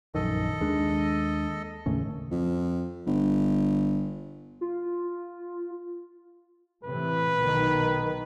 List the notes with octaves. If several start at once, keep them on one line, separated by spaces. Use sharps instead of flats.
A#1 F#2 D#3 A4 D#5
D#2 G#3 D4
D#2 A2 C#3
F2
G1
F4
A2 C3 E3 B4
B1 D#3